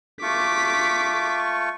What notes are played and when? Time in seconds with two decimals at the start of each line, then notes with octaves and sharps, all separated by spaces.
0.22 A3 F4 C#6 D6 B6